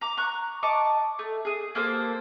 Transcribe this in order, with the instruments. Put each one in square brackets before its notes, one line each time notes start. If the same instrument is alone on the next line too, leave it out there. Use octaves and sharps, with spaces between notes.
[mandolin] A#5 D6
A#5 C#6 F#6
D#5 A5 C#6 D6
A3
G#4 D#6
A#3 G4 A4 C5